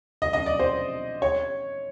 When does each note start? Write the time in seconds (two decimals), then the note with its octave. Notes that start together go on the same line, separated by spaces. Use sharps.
0.22 D#5
0.33 D#5
0.46 D5
0.59 C5
1.22 C#5